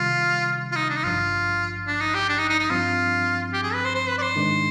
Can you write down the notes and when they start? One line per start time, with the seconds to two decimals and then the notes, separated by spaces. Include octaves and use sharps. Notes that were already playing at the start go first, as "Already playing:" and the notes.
Already playing: C3 D#3 G3 F4
0.72 F4
0.76 D#4
0.90 D4
0.96 D#4
1.04 G#1 G2 F3 F4
1.87 D4
2.01 D#4
2.14 G4
2.29 D4
2.39 D#4
2.49 D#4
2.59 D#4
2.70 G2 F3 C4 F4
3.53 G4
3.63 G#4
3.74 B4
3.85 C5
3.95 C5
4.08 B4
4.18 D5
4.22 C5
4.36 G#2 D#3 G#3 D4